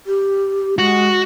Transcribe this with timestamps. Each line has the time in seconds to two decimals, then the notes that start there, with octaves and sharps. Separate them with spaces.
0.06 G4
0.78 G#3 F#4